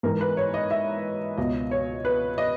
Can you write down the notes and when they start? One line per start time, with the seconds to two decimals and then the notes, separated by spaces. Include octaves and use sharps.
0.03 G#2 E3 A#4
0.21 B4
0.37 C#5
0.54 D#5
0.71 E5
1.37 C#2 B2 D#5
1.71 C#5
2.05 B4
2.38 D#5